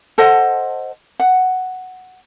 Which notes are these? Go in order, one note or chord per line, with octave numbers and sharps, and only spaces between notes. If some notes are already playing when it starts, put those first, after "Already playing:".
A4 C5 D#5 F#5
F#5